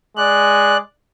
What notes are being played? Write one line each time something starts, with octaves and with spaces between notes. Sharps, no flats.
G#3 D5 F#6